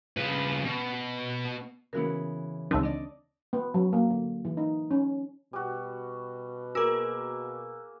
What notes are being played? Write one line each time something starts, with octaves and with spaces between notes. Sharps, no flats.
C#3 B4
B2
C#3 E3 B3 E4 F#4 A#4
C#2 D#3 C4 A5 E6
D4 D5 D#5
B3
F#3
A#3
D3
E3
D#4
C#4
B2 G3 F#4
A#3 F#4 G#4 A#4 E6